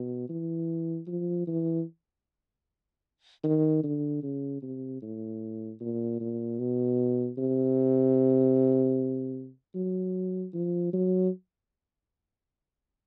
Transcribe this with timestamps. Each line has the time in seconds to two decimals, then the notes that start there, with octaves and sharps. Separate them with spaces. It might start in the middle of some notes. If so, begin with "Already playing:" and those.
Already playing: B2
0.29 E3
1.08 F3
1.47 E3
3.44 D#3
3.84 D3
4.23 C#3
4.63 C3
5.02 A2
5.81 A#2
6.21 A#2
6.59 B2
7.38 C3
9.75 F#3
10.54 F3
10.93 F#3